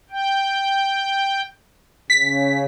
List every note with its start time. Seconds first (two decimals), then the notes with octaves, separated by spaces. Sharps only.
0.10 G5
2.10 C#3 B6